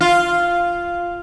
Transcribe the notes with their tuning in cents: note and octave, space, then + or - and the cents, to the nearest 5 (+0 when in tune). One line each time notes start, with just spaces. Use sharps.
F4 -5